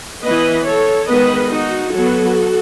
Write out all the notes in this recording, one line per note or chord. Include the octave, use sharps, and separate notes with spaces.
E3 B3 B4 D#5
A4 C#5
D#3 G#3 B3 B4 D#5
D#4 F#4
F#3 B3 F#4 A4